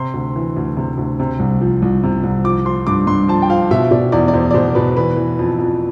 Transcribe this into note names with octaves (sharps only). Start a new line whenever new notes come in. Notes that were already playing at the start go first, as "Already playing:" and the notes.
Already playing: C3 C6
D2
E3
D2
C3
D2
C3
C2
F3
C2
C3
C2
F3 D6
F3 C6
G2 D6
G2 C6
F3 A5
G5
F3 F5
B2 E5
B2 D5
E2 D5
D5
E2 C5
D5
B2 C5
B2 B4
E3 B4
E3
F2
F2